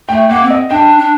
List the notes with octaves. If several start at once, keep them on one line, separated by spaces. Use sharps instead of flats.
A3 G5
A#3 F#5
C4
D#5
D4 G5
D4